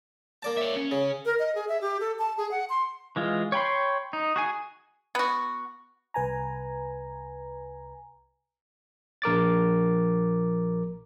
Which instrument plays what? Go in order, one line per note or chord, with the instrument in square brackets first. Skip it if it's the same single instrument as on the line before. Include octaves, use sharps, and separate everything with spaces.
[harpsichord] A#3 D5 A5
[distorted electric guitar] C#5 E5
C#4
[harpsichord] C#3
[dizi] A#4
D#5
G#4
E5
G4
A4
A5
G#4
F#5
C6
[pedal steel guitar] E3 G#3 F4
C#5 G5 B5 C6
D#4
F#4 G#4 G#5
[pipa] B3 F#4
[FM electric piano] C2 B4 G#5 A#5
[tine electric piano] A#1 A#4 D6 A6